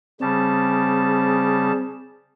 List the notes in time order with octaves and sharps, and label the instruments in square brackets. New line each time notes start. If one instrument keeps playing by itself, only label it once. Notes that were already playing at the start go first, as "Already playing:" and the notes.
[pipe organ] C#3 G3 A5 [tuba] C4 [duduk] G#4